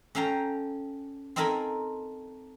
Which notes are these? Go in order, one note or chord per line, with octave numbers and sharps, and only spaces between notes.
C#4 A4 F5 G5 A#5
C4 D#4 A4 A#4 G#5 B5